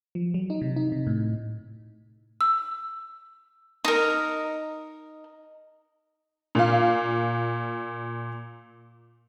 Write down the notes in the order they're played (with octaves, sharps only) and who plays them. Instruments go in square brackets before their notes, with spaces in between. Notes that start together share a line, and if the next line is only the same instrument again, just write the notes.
[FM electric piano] F3
F#3
D#4
C3
D#4
C3
A2
[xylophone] E6
[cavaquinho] D#4 A#4
[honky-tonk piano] A#2 F5